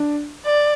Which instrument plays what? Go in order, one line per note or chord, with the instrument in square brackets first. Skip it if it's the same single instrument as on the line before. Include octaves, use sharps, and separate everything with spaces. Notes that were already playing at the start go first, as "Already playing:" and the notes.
Already playing: [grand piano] D4
[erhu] D5